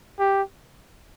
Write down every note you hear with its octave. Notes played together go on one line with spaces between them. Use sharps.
G4